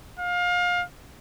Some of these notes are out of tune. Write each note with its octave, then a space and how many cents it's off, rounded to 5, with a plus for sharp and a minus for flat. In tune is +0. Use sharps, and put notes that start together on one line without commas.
F5 +25